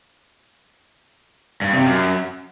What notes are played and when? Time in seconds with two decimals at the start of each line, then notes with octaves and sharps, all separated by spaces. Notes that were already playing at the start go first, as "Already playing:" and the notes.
1.61 G2
1.73 C3
1.85 F#2